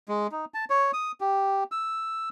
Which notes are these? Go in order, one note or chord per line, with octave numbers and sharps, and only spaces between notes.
G#3
D#4
A5
C#5
D#6
G4
E6